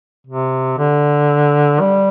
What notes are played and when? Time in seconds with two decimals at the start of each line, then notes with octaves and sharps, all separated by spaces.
0.27 C3
0.78 D3
1.81 G3